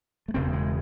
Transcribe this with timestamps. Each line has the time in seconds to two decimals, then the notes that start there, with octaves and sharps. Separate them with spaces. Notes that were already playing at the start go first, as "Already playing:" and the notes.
0.28 A3
0.34 E1 E2 C#3 C4
0.53 G#3